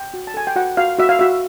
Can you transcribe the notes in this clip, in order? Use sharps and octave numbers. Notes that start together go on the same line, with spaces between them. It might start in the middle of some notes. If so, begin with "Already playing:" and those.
Already playing: G5
F#4
A5
A4 G#5
G5
F#4 F#5
F#4 F5
F#4 E5
F5
F#4 E5